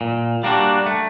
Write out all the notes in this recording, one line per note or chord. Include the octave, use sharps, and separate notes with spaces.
A#2
G3 A#3 D4 F#4
A3